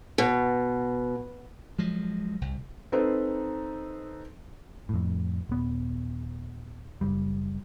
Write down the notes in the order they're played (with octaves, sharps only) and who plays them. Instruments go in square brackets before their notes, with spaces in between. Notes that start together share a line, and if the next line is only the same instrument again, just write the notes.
[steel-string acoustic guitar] B2
[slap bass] F3 F#3 G#3
C2
[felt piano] C4 D#4 A4 B4 C5
[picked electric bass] F2 A2
D#1 B3
F#1 G3